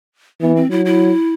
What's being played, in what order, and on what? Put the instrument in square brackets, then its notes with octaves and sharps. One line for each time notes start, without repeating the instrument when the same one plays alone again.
[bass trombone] E3 [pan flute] B3
[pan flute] C4
[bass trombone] F#3 [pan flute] E4
[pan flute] E4